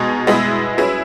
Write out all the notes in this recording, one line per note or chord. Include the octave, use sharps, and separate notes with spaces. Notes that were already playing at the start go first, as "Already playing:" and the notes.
Already playing: B2 G#3 D#4 G#4
G#3 B3 E4 G#4 B4
F#3 C#4 E4 G#4 B4